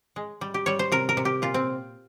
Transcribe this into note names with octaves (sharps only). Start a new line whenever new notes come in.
G#3
G3
G4
G3 C#5
C5
C3 A#4
A#4
C3
G4
A#2 F4
C4